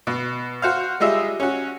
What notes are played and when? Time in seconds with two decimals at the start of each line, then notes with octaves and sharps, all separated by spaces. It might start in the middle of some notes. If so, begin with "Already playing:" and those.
0.07 B2
0.62 F#4 C5 F5
1.00 G3 G#3 F4 D#5 E5
1.40 C#4 F#4